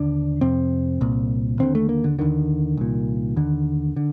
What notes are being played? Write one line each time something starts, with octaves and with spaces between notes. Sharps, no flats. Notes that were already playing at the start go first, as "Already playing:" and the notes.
Already playing: D#2 D3 D4
F2 C3 C4
C2 A#2
D#2 D3 C4
A3
A#3
D3
D#2 D3 D#3
C2 A#2
D#2 D3
D3